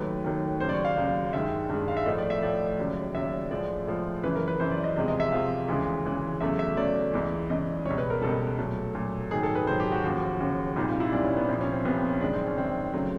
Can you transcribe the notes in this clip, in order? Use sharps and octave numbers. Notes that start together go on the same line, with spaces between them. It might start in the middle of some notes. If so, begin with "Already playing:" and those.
Already playing: D#2 D#3 F#3 A3 B4
D#2 D#3 F#3 A3
D#2 C#3 F#3 C5
D5
C#5
F5
D#2 C#3 F#3
G2 D#3 G#3 E5
G2 D#3 G#3
F5
E5
A2 F3 A3 D#5
D5
E5
A2 F3 A3 D5
D#2 C#3 F#3
D#2 C#3 F#3 E5
A2 F3 G#3 D5
A2 F3 G#3
F#2 C#3 E3 B4
A#4
B4
F#2 C#3 E3 C5
D5
D#5
E2 C3 F3 G#3 D#5
D#5
E5
E2 C3 F3 G#3 F5
D2 C#3 E3 G#3
D2 C#3 E3 G#3
E2 C#3 F#3 A3 E5
E5
E2 C#3 F#3 A3 D5
C#2 C#3 E3
C#2 C#3 E3 D#5
C#2 B2 G3 C#5
B4
A#4
C#2 B2 G3 A4
A#2 F#3 A3
A#2 F#3 A3
G#2 D#3 F#3 G#4
A4
B4
G#2 D#3 F#3 C5
G4
F#4
D#2 C#3 F3
D#2 C#3 F3
C2 A#2 G3 D#4
F4
E4
C2 A#2 G3 D4
C#4
B3
C2 A#2 F3 C4
C#4
C4
C2 A#2 F3 B3
C4
C#4
F#2 D#3 G#3 D4
C4
C#4
F#2 D#3 G#3 C4
C#3 F#3 A3